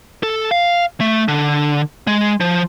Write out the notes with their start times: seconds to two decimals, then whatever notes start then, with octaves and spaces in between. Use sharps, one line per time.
0.23 A4
0.51 F5
1.00 A3
1.28 D3
2.07 G#3
2.40 F3